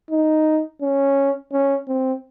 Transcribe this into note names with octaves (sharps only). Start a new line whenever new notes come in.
D#4
C#4
C#4
C4